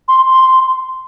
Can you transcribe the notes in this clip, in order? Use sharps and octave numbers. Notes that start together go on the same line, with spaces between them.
C6
C6